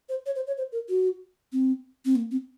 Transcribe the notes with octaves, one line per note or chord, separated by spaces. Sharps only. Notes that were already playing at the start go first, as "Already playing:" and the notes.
C5
C#5
C5
C#5
C5
A#4
F#4
C4
C4
A#3
C4